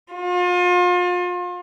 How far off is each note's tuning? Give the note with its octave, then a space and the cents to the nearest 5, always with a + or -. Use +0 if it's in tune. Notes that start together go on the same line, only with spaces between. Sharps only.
F4 +35